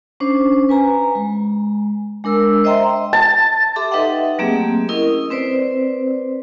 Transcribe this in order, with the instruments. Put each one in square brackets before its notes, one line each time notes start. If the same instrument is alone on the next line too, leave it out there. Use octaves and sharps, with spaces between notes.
[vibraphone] C#4 D4 C5
B4 G#5 A#5
G#3
G#3 D4 A#4 E6
C5 D#5 E5 G5 A#5 C6
[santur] A5
[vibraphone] G4 A4 E5 C6 D6
D#4 B4 D#5 E5 F#5 G5
F#3 A3 A#3 C4 G4 G#4
C#4 E4 A#4 D#5 D#6
C4 B4 C5 D5